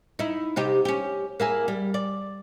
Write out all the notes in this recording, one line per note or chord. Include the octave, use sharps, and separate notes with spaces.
D#4 E4
C3 D#4 G4
C#4 G4
A#3 E4 G#4
G3
D5